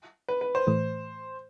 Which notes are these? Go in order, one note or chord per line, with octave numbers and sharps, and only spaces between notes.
B4
B4
C5
A2 E3 A3